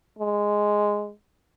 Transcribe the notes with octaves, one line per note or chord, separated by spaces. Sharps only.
G#3